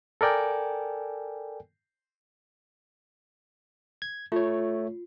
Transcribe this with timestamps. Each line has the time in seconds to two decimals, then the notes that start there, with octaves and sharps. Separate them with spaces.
0.21 A4 A#4 D5 G5 G#5
4.02 G#6
4.32 A3 F4 C#5